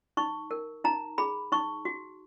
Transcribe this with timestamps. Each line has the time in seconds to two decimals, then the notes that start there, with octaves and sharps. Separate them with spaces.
0.17 D#4 C#6
0.51 A#4
0.84 D#4 A#5
1.18 G#4 B5
1.52 D#4 C#6
1.85 F#4